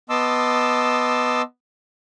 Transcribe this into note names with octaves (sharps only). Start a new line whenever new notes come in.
B3 D#5 A5 C6 D6 E6